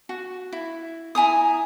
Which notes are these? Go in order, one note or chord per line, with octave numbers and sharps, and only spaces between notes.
F#4
E4
E4 G#5 A#5 D#6